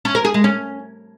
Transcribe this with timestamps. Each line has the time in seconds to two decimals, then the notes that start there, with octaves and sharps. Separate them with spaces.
0.05 C#4
0.15 A#4
0.25 G#4
0.34 G#3
0.44 C#4